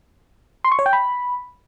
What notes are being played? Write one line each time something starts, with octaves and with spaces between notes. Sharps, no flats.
C6
C#6
C#5
G5
B5